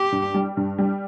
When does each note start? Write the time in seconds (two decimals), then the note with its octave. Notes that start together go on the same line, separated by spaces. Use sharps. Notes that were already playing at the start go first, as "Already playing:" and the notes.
Already playing: G4
0.12 G2
0.34 G3
0.57 G2
0.79 G3